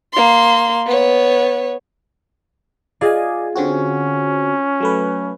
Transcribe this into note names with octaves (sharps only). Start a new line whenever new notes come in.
A#3 C6
B3 C#5
F4 G#4 D5 D#5 G#5
D3 C4 C#4 F#4
F#3 A3 B4